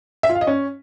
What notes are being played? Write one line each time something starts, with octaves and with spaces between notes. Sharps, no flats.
E5
F4
F5
D#5
C#4